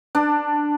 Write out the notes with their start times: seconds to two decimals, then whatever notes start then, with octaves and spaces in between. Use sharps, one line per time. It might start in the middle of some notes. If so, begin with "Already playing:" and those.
0.15 D4